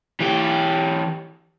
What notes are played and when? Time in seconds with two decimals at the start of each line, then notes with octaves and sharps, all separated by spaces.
0.20 E3 G4